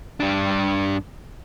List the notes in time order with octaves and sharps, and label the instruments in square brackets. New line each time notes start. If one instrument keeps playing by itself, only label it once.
[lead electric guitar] G2 D4